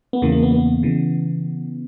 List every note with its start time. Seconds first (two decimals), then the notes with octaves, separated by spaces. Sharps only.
0.13 B3
0.22 E2 C#3 E3 A#3
0.32 A#3
0.43 B3
0.53 B3
0.83 C#3 E3